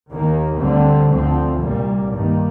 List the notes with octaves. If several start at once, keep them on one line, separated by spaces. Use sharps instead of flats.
D#2 D#3 A#3
D2 D3 G3 C4
D2 D3 F3 C4
C2 A#2 G3 A#3
G2 D#3 G3 A#3